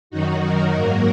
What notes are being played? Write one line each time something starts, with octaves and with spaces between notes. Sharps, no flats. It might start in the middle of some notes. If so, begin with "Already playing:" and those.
F#2 D#3 F#3 D#4 F#4
F#4 A#4
G#2 F#3 A#3